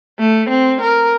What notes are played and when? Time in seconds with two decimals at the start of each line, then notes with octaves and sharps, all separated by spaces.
0.19 A3
0.49 C4
0.81 A#4